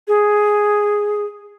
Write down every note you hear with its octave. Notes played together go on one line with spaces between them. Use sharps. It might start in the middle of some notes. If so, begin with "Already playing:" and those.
G#4